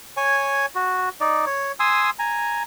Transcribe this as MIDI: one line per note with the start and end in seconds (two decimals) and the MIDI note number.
0.17 0.66 73
0.17 0.66 80
0.75 1.09 66
1.20 1.45 63
1.20 1.45 74
1.46 1.72 73
1.80 2.10 80
1.80 2.10 84
1.80 2.10 87
1.80 2.10 88
2.19 2.63 80
2.19 2.63 82